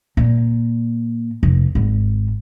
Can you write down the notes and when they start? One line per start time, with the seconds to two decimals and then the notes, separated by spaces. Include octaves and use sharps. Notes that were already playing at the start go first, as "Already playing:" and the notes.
0.17 A#2
1.43 F1
1.75 G#1